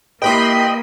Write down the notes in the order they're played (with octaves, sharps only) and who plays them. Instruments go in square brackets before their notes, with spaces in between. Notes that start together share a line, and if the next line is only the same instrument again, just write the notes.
[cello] A#3 [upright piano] E4 G4 B4 [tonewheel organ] D#5 [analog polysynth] G5 B5 C6